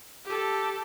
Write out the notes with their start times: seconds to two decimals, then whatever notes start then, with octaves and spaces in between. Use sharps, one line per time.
0.25 G4 A4